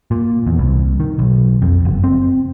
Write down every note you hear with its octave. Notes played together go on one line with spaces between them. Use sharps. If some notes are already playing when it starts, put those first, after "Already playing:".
A#2
E2
C2
D#3
B1
F2
F#1
C4